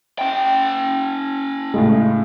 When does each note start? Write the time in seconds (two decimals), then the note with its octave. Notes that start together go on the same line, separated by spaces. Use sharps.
0.19 C#4 G5
1.74 A2 C#3 G#3